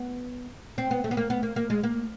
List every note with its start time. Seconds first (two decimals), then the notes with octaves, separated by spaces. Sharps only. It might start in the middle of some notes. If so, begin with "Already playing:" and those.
Already playing: B3
0.78 C4
0.91 B3
1.04 A3
1.11 B3
1.17 A#3
1.30 B3
1.43 A#3
1.56 A#3
1.70 G#3
1.83 A#3